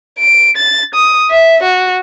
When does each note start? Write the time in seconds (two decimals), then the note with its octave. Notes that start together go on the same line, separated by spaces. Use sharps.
0.19 D7
0.57 A6
0.94 D#6
1.30 E5
1.63 F#4